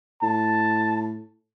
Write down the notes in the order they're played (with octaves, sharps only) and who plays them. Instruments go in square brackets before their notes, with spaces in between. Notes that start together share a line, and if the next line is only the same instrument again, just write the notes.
[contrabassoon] A2 [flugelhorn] A5